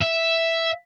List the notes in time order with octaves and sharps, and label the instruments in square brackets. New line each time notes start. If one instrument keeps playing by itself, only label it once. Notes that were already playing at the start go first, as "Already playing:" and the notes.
[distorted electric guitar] E5